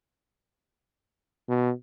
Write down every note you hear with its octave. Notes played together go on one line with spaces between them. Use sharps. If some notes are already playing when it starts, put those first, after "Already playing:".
B2